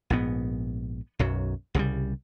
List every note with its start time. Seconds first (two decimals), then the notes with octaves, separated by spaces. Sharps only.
0.10 A#1 G#2 B3
1.19 B1 F#2 F#3
1.75 C2 C#3 F#3 G3